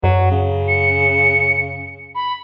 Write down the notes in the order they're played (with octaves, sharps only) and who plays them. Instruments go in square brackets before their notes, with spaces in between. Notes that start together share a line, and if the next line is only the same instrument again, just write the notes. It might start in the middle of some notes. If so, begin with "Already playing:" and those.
[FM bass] F#2 [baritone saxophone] F#3
[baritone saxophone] C#3
[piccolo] C#7
B5